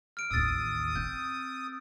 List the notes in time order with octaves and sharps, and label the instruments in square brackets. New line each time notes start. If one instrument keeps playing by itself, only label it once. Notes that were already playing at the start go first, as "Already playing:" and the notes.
[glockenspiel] F6 D7
[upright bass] A1 D#2 [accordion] D#6 [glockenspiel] E6 A6
[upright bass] C4 [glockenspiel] G6